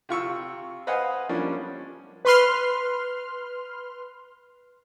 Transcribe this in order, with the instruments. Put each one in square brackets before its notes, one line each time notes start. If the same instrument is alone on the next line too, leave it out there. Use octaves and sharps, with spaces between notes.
[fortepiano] C3 F4 C#6 E6
B4 C5 D#5 F5 F#5 G#5
F3 G3 A#3 C#4 D4
[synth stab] B4 C6 F6